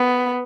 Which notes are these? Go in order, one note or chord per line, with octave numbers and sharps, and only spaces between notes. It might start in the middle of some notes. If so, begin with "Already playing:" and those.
Already playing: B3